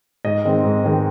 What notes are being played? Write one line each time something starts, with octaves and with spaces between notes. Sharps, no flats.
G#2 D#5
D#3 G#3 C4
G#2
D#3 G#3 C4